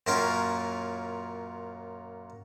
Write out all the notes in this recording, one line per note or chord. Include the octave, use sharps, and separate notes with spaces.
F#2 A#2 C#4 F4 A#4 G5